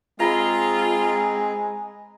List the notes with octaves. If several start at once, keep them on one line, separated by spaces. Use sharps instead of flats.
G#3 C4 F4 G#4 A#5 B5